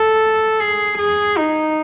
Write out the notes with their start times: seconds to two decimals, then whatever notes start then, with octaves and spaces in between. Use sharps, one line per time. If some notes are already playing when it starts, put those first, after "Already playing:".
Already playing: A4
0.60 G#4
0.99 G#4
1.38 D#4